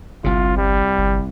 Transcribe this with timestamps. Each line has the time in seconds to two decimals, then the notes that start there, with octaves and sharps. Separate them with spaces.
0.24 G1 C2 C3 F4
0.58 G3
0.98 G1